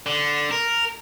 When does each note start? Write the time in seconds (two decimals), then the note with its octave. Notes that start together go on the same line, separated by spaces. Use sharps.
0.06 D3
0.51 A#4